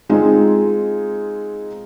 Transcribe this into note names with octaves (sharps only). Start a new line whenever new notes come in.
G#3 C4 D#4 F4 G#4